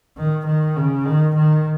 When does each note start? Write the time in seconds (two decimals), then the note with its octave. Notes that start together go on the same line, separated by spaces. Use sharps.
0.17 D#3
0.46 D#3
0.76 C#3
1.06 D#3
1.35 D#3